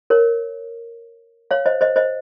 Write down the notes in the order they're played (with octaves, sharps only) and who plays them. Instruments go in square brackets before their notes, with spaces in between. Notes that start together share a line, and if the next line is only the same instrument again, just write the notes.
[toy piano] A#4 C#5
C#5 F5
C5 D#5
C5 D#5
C5 D#5